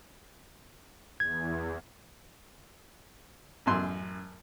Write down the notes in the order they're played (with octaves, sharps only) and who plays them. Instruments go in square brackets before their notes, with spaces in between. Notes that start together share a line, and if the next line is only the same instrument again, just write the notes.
[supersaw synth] E2 [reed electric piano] G#6
[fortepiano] A1 F#2 C6